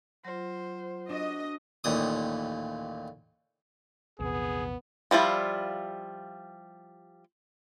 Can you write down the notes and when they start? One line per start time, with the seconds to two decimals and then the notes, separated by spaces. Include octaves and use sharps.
0.25 F#3 F4 C5
1.09 D4 F#4 D#5
1.84 A1 D#2 A#2 D#6
4.20 A#1 E2 C3 B3 G#4
5.11 F3 G3 E4 F4